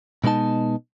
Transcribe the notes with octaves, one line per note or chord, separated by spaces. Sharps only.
B2 G#3 B3 D#4 A5